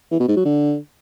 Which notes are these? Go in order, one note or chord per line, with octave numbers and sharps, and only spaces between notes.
E3
B2
G#2
F#3
D3